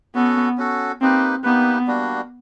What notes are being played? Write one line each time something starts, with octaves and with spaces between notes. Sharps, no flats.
B3 C#4 F#4 A4
C#4 F#4 A4
A#3 C4 D#4 G4 B4
A#3 B3 D#4 G4 B4
G3 A#3 D4 F#4